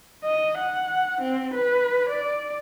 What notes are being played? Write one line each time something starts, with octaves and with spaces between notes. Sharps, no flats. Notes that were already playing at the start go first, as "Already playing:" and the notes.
D#5
F#5
C4
B4
D5